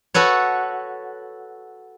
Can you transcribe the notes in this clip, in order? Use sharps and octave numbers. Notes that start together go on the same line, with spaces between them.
F#4 A4 B4 C#5